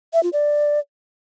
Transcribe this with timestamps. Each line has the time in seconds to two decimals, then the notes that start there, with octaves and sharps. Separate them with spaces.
0.13 E5
0.23 F4
0.33 D5